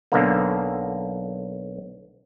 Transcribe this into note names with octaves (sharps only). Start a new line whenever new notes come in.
B1 D3 A#3